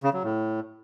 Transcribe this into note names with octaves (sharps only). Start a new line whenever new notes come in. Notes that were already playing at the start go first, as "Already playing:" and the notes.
C#3
F#3
A2